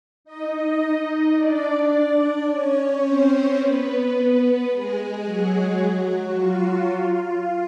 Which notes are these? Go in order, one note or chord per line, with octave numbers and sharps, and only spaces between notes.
D#4 D#5
D4 D5
C#4 C#5
C4 C5
B3 B4
B3 B4
G#3 G#4
F#3 F#4
F#3 F#4
F4
F4